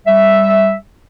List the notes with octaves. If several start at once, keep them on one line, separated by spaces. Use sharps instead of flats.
G3 E5